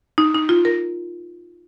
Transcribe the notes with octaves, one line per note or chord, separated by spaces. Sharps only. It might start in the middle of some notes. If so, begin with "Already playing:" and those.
D#4
D#4
F4
A#4